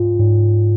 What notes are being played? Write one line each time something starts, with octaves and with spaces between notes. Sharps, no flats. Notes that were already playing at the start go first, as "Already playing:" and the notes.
Already playing: G#2 F4
G#2